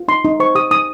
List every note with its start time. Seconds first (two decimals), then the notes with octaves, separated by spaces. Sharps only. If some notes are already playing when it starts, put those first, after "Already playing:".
Already playing: F4
0.08 D#4 C6
0.25 D#4
0.40 C5 C#6
0.55 G4 D#6
0.71 D#4 D#6